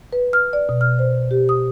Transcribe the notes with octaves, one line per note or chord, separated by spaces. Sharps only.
B4
F6
D5
B2
F6
C5
G4
D#6